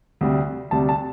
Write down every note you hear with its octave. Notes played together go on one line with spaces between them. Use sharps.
D2 C3 G3
D2 C3 G3 A5
A5